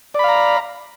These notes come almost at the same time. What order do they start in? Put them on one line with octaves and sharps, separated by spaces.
D5 B5 F5 A#5